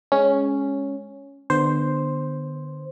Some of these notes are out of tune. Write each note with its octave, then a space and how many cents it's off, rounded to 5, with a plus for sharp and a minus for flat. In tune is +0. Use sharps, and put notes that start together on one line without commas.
G#3 +0 C#4 +0
D3 +30 B3 +0 C5 +0